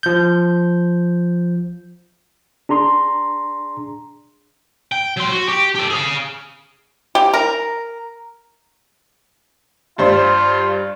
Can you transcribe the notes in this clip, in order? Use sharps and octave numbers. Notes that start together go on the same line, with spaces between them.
F3 G6
D4 G#4 A#5 C6
G5
F#3 C6
F#4
G4 G5
G4 A4
G#4 F5
G4
A#4
G2 G3 F4 C5